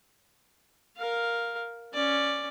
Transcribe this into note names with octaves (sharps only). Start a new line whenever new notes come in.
A#4 F5
C#4 D5